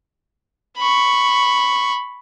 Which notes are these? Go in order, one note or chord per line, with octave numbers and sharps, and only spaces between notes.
B5 C#6